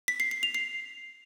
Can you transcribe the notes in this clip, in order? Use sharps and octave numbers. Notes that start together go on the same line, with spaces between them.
B6
C7
C7
F7
C7